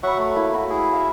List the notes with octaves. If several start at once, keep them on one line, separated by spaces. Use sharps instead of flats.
F#3 E5 F#5 B5 C#6
A3 A#5
A#3 E4
F#4 B5
E4 G#4
E5 F5